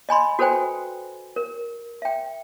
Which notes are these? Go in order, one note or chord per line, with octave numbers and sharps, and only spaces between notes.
D#5 G#5 B5 C6
F#4 A4 B4 C5 G5 G#5
A#4
E5 G5